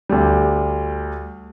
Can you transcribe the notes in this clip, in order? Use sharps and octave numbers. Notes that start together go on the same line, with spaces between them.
D2 G3